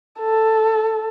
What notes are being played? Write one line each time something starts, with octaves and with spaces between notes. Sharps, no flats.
A4